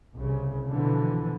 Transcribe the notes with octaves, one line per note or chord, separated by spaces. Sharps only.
C2 C#3
B2 D3 E3 F3